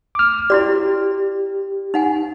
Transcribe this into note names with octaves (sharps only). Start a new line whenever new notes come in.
D6 F6
E4 F#4 G4 D5
D#4 F#5 G#5